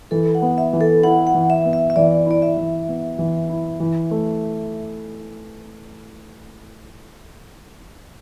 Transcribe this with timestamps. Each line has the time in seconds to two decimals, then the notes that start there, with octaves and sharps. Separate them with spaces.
0.11 E3 A4
0.35 F#5
0.42 B3
0.58 E5
0.73 E3
0.81 A4
1.03 E4 F#5
1.27 F#5
1.34 E3
1.50 E5
1.65 B3
1.73 E5
1.90 E5
1.96 E3 D5
2.26 E4 D5
2.42 E5
2.57 E3
2.88 B3
3.18 E3
3.49 E4
3.80 E3
4.11 A3